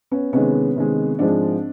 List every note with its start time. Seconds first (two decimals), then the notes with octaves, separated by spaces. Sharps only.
0.11 B3 C#4
0.33 C3 D#3 G#3 B3 C#4
0.76 C3 D#3 G#3
1.19 G#2 F3 G#3 C4 D4